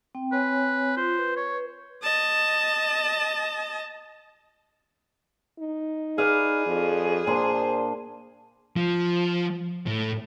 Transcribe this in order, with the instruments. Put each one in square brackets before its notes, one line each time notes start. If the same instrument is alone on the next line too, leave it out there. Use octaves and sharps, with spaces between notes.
[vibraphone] C4 G5
[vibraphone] C4 C#5 G#5 [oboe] B4
[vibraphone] F4 [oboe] C5
[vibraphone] B4
[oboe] C#5
[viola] D#5 A5
[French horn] D#4
[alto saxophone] G#4 [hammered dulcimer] B4 D5 F5
[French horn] F2
[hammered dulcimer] A#2 D4 C6 [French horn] C5
[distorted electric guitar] F3
A2